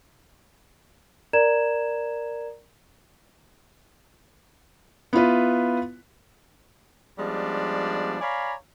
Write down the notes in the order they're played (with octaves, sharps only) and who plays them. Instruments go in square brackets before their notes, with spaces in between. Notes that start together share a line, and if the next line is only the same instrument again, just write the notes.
[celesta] A#4 D5 A#5 G#6 E7
[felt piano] B3 E4 F4 B4
[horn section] F3 G3 G#3 B3 C#4 D4
C#5 D5 F5 G#5 A#5 B5